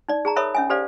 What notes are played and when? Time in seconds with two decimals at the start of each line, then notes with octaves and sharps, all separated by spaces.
0.08 D#4 D5
0.25 G#4 A5 A#5
0.36 A4 A#4 C#5 E5 B5 D#6
0.55 C#4 E5 G#5
0.70 G4 A4 C5 D5 F5